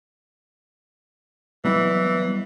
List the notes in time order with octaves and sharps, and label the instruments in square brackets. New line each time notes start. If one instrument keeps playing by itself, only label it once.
[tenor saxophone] E3 [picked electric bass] F#3 G3 B3